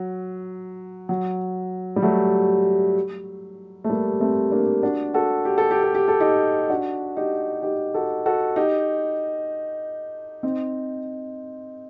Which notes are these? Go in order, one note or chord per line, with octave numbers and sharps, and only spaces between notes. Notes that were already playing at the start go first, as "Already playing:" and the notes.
Already playing: F#3
F#3
G3
F#3 A3
A3
G3 A#3
A3 C4
A#3 D4
D4 F#4
F#4 A4
G4
A4
G4
A4
G4
A4
D#4 G4
D4 F#4
D#4 G4
D#4 G4
F#4 A4
F#4 A4
D#4 G4
C4 D#4